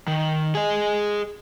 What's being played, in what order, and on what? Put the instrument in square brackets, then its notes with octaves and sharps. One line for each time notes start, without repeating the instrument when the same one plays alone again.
[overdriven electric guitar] D#3
G#4 D#5